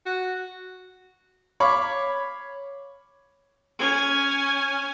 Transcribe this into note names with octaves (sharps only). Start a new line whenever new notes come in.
F#4
C#5 F5 B5 C#6 D6
C#4 G#5